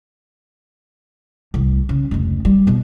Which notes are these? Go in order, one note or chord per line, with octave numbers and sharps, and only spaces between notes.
D1 C2
C#3
F1 C#2
G3
F#2 B2